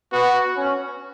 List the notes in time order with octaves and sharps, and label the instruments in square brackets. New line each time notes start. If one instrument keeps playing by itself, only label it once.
[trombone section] B3 [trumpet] F#4
[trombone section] C#4